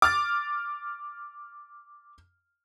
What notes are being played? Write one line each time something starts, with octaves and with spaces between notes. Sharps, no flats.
D6 F6 A6